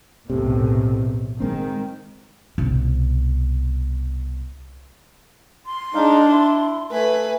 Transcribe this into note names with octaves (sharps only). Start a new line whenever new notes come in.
B1 E2 A2 C3
D#3 G#3 A#3 C4
C2 B2
C6
G#3 D4 D#4 F5
E4
A3 B4 G#5